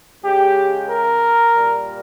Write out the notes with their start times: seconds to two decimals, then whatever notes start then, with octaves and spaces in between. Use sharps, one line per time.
0.23 C#3 G#3 G4
0.89 A#4
1.54 A#2 G3